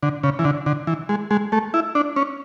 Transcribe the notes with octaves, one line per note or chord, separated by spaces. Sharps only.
D3
C#3
E3
D3
D3
E3
G#3
G#3
A3
E4
D4
C#4